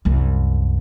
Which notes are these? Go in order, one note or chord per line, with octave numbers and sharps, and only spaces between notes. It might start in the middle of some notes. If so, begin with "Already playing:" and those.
C2 F#2